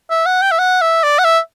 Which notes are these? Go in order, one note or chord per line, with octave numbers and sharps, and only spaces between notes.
E5
F#5
G5
E5
F#5
E5
D5
F#5
E5